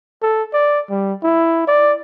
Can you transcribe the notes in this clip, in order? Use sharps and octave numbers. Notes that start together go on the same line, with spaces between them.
A4
D5
G3
E4
D5